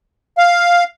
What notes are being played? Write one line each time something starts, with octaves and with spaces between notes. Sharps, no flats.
F5